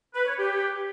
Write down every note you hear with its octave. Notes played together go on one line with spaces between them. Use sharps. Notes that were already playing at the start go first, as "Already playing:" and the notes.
B4
C#5
G4